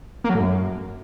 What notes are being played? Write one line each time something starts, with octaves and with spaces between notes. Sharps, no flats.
A#3
F#3
A2
F#2